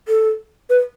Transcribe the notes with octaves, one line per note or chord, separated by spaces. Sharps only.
A4
B4